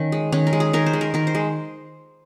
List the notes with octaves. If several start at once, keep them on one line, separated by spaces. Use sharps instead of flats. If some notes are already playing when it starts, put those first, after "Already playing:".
Already playing: D#3 C#4
G#3
D#3 C#4
A#4
G#3
G#4
D#3 A#4
C5
G#3
A#4
D#3 A#4
C5
G#3